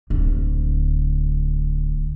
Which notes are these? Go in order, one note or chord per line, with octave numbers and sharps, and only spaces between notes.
D1 D2